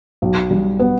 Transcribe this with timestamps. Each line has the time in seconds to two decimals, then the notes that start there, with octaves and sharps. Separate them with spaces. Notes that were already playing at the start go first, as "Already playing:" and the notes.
0.22 B1
0.51 G3
0.79 B3